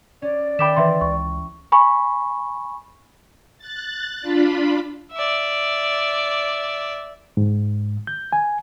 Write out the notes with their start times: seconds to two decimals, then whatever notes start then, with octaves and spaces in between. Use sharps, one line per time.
0.22 C#4 D5
0.59 D#3 E5 G5 B5 D6 E7
0.77 E3 B4 E5 C6
1.01 C#2 C#6
1.72 G#5 B5 C#6
3.58 F#6 A6
4.21 D4 F4 B5
5.12 D5 E5
7.37 G#2
8.07 G6
8.33 G#5